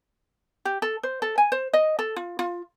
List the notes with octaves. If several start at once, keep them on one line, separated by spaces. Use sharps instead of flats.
G4
A4
C5
A4
G#5
C5
D#5
A4
F4
F4